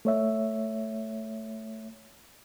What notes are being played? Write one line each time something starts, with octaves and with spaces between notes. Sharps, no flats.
A3 C#5 E5